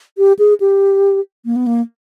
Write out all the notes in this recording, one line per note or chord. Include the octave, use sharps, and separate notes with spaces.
G4
G#4
G4
A#3
B3
A#3